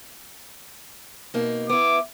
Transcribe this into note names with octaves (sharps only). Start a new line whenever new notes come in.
B2 A#3 D#4
B3 E4 D6